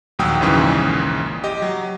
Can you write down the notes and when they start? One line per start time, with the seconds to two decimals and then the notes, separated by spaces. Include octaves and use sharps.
0.19 A#1 D#2 F#3 G5 D#6 E6
0.41 A#1 D#2 G#2 C#3 E3
1.44 G4 D#5
1.62 F#3